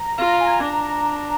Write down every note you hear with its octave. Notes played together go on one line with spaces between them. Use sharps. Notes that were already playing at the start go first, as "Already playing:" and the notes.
Already playing: A#5
F4 A#5
A#5
G#5
A#5
D4 A#5